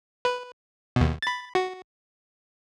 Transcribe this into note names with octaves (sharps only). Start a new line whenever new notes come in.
B4
D#2 B2
B5 A6
F#4